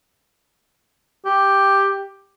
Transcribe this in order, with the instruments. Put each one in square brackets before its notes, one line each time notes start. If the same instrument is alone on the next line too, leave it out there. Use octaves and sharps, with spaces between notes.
[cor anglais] G4